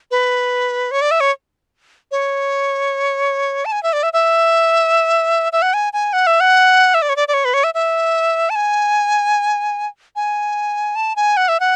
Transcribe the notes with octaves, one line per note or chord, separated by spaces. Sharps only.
B4
C#5
D5
E5
C#5
C#5
A5
G#5
E5
D5
E5
E5
E5
F#5
G#5
G#5
F#5
E5
F#5
E5
D5
C#5
D5
D5
C#5
B4
C#5
E5
E5
A5
G#5
G#5
A5
G#5
F#5
E5
F#5